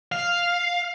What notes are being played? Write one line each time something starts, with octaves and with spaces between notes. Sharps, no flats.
F5